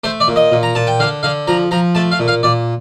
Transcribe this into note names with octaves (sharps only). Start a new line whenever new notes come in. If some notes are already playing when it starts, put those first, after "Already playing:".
A3 C5
D5
A#2
D#5
A#2
A#5
A#2 A5
G5
D3 F5
D3 F5
F3 A#5
F3 A#5
A3 A5
F5
A#2
F5
A#2 D5